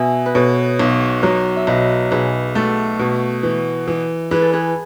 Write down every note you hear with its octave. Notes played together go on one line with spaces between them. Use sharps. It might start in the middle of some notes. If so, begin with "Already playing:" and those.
Already playing: B2 E5 G#5
B4
B2 A4 C#5
B1
F#3
E5
B1 B4 D#5
B1 G#4 B4
A3 F#4 A4
B2
E3
E3
E3 G#4 B4
A4
G#4 B4